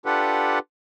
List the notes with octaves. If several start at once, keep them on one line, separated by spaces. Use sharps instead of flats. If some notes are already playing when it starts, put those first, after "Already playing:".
D4 F4 G4 A4 B4 F#5